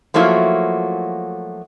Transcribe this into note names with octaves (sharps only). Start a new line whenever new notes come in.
F3 F#3 A3 A#3 E4 F#4